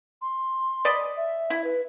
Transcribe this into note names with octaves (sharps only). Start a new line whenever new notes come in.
C6
D5 D#5 B5
E5
E4
B4